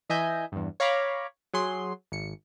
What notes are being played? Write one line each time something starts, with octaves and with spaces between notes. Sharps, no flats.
E3 D#5 E5 G#5 G6
E2 G2
C#5 F5 A#5 B5 D6
F#3 G#4 C6 C7
G#1 C#7